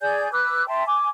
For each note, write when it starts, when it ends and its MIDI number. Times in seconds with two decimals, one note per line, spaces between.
0.01 0.31 68
0.01 0.31 74
0.01 0.31 80
0.01 0.31 91
0.33 0.67 71
0.33 0.67 86
0.33 0.67 88
0.33 0.67 90
0.68 0.84 76
0.68 0.84 79
0.68 0.84 81
0.68 0.84 84
0.86 1.08 80
0.86 1.08 86